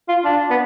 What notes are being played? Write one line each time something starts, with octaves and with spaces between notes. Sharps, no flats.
F4
D4
B3